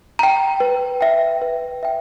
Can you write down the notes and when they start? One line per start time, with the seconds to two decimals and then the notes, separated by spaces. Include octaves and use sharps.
0.19 G5 A#5
0.60 B4
1.01 E5 G5
1.42 B4
1.83 E5 G5